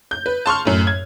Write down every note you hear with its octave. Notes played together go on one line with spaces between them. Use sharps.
G6
B4
A5 C6 C#6 F6
F#2 A2
G#6